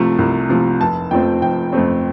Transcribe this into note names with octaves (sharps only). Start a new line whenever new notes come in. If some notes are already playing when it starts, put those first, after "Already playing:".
Already playing: C2 C3 F3 A3
C2
C3 F3 A3
F1 A5
F2 F3 A3 C4 G5
F1 G5
F2 F3 A3 C4